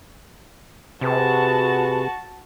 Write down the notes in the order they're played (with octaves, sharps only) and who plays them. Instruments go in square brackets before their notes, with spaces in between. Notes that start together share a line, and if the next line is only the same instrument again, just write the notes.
[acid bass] C3 [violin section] F#4 A5 [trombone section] G#4 B4